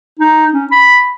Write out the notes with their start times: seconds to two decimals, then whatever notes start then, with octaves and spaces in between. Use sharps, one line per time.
0.19 D#4
0.53 C#4
0.71 B5